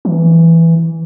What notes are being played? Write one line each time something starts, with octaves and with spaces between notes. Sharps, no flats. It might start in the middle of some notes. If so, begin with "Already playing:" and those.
E3